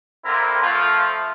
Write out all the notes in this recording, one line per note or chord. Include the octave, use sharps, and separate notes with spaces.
D3 C4 E4 F4 A#4
F3 A3